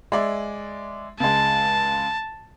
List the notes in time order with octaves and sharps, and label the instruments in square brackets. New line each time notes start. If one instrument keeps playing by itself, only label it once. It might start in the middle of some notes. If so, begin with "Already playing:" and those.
[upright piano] G#3 D5 E5
[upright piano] C#2 G#3 [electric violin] A5